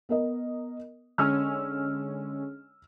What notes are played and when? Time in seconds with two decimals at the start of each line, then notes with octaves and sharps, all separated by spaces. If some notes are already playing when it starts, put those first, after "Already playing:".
0.09 B3 A#4 D#5
1.18 D3 G#3 C#4 E6 F6